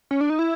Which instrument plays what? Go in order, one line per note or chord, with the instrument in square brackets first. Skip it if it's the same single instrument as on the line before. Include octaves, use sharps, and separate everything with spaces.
[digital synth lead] C#4
D4
D#4
E4